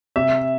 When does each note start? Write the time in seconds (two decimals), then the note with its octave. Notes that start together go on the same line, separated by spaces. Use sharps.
0.16 C3 E5